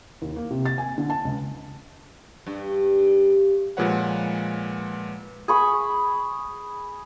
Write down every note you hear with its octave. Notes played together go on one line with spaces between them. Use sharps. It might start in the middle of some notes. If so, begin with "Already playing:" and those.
D#2
A#3
C3
A6
G#5
D3
A5
C#2
G2
A#2 F3 G#3 B4 C#5 F#5
G#4 B5 C#6